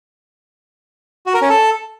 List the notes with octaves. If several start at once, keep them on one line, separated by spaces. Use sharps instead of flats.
F#4
A#4
C#4
A4